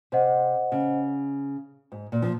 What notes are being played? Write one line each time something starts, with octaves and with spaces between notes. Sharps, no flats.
C3 C5 D#5 F#5
C#3
G#2
A#2
F3